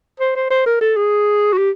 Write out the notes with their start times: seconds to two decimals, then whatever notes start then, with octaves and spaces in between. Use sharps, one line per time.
0.19 C5
0.36 C5
0.50 C5
0.66 A#4
0.81 A4
0.96 G#4
1.53 F#4
1.58 G4